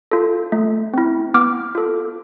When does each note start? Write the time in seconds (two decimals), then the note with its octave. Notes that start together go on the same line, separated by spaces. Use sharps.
0.12 F4 A4
0.52 A3
0.94 C4 E4
1.34 B3 D6 F6
1.75 F4 A4